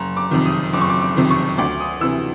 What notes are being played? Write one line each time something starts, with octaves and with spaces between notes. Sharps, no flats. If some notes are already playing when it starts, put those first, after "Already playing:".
Already playing: F#1 A#5
D6
F2 C3 D#3
D#6
F#1 D6
C#6
D6
D6
F2 C3 D#3
C#6
D2 D6
D#6
C3 E3 E6